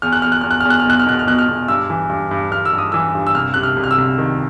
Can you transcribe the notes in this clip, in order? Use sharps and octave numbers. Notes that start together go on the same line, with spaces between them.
E2 F6
F#6
E2 F6
F#6
E2 F6
F#6
F6
E2
F#6
F6
B2 F#6
F6
B2 F#6
F6
B2 F#6
F6
B2
G2 E6
E3
G2
G2
G2 F6
E6
G2
D#6
E3 E6
G2
E6
C2 F6
C3 F#6
F6
C2
F6
E6
C2
D#3